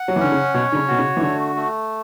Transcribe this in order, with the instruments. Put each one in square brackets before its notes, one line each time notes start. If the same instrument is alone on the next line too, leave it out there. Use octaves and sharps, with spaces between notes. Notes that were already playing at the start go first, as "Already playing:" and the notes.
Already playing: [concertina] F#5
[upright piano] F#3
E3
[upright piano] D3 [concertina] C#4
[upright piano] C#3
[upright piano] B2 [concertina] C#5
[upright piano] D3
C#3
[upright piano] B2 [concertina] F#4
[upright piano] C#3
E3
[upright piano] D3 [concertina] A3
[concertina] A3